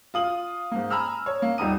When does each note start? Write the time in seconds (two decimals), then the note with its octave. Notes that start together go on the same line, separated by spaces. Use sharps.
0.14 F4 D#6 F#7
0.71 G#2 A#3
0.90 G#5 A#5 B5 E6 F6
1.26 C#5
1.42 A#3
1.58 D#1 G3 D#4 A#5 D#6 D#7